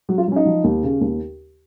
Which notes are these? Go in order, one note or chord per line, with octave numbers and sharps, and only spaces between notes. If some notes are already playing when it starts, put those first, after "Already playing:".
F#3 F#4
F4
F#3 C#4
D#4
F3
D#2
C#3
D#2